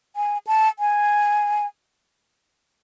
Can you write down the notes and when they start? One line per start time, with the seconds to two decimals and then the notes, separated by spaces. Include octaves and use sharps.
0.16 G#5
0.47 A5
0.79 G#5